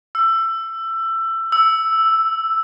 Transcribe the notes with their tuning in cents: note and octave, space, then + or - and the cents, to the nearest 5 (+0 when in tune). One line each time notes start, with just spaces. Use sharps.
E6 +20
E6 +0